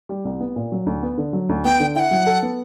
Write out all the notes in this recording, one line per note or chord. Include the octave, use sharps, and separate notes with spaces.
G3
C2
B3
A#2
F#3
D2
B3
D3
F#3
D2
B3 G5
D3
E4 F#5 G5
F#3
A4
B3